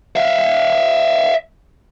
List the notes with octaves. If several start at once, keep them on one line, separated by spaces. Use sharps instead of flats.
E5 F5